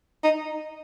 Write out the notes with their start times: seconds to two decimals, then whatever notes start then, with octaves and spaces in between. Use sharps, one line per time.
0.24 D#4